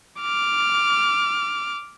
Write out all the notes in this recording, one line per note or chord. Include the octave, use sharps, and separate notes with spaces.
D6 F6